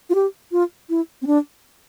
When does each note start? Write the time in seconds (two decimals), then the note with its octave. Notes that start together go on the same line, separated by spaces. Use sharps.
0.10 F4
0.15 G4
0.52 F4
0.89 E4
1.22 C4
1.27 D4